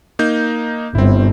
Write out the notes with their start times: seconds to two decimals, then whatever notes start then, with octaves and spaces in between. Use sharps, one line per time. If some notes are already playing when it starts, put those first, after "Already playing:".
0.19 A#3 D#4 G6
0.95 G1 C4 E4